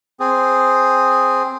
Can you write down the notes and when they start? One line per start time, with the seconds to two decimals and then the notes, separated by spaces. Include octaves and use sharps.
0.20 C4 G#4